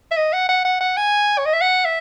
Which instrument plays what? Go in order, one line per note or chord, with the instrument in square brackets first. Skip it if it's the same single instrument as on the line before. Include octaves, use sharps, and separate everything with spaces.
[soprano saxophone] E5
D#5
F#5
F#5
F#5
F#5
G#5
C#5
D#5
E5
F#5
E5